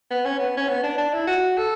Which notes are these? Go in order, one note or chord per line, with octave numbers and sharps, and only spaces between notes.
B3
C#4
B3
C#4
B3
D4
D4
E4
F#4
A4